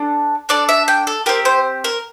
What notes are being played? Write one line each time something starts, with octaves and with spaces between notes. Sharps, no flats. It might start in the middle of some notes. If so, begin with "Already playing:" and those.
Already playing: D4 A4
D4 A4 D5
E5
G5
A4
C4 G4 A#4
C5
A#4